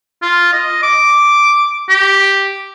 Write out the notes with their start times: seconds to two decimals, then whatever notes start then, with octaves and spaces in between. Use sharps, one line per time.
0.22 F4
0.53 D#5
0.83 D6
1.89 G4